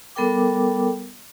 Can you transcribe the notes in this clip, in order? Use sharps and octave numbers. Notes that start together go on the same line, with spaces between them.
G3 B3 A4 A#4 G5 D6